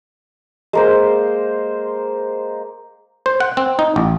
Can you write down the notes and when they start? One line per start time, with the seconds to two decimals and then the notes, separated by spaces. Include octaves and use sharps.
0.73 G#3 A#3 C5
3.26 C5
3.40 F#5
3.57 C4
3.79 D#4
3.96 A1